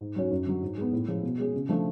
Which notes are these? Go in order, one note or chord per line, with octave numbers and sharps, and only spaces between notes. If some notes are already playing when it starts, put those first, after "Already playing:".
G#2
F#3 C#4 F#4
F#2
D3 F#3
G#2
G#3 B3
A2
F3 G#3 C#4
B2
G#3 C#4 G#4
C#3
F3 A3 D4